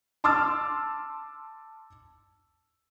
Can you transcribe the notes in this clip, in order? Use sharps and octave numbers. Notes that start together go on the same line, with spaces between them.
A5 C6 D6 E6 F6 A6